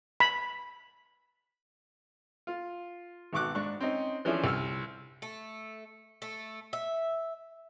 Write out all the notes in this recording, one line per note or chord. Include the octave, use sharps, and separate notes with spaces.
B5
F4
G#1 B2 C#6 D6 F#6
G#2 D4 C#6 F#6
C4 C#4 D#4
E3 F3 C#4 D4 E4 G#4
C2 E6 F6
A3
A3
E5